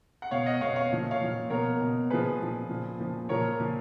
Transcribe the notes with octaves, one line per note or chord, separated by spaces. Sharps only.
F#5
B2 C#5 F5
D#5 F#5
B2 C#5 F5
C#5 F5
A#2 F3
C#5 F5
A#2 F3
B2 A#4 C#5
B2
A#2 F3 G#4 B4
A#2 F3
A#2 F3
A#2 F3
A#2 F3 A#4 C#5
A#2 F3